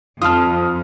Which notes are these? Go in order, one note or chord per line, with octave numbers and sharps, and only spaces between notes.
F2 F4 A5 D#6 F6